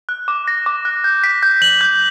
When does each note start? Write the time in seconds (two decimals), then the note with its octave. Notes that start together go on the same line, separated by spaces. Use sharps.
0.09 F#6
0.28 D6
0.48 A#6
0.66 D6
0.85 F#6
1.04 G6
1.24 B6
1.43 G6
1.62 F#7
1.81 G6